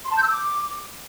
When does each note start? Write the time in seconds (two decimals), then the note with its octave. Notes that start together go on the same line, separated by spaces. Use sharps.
0.05 C6
0.11 A5
0.17 G6
0.23 E6
0.29 D6